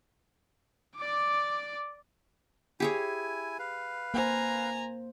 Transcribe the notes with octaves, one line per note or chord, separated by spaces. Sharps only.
D5 D6
E4 G4 G#4 C#5 G#5
B4 F5
A#3 C5 G#5 A#5